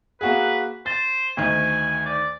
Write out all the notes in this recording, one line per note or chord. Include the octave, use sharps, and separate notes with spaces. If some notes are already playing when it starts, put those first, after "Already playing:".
A#3 F#4 G#4 B4
C5 A6
D2 D#3 G#5
D5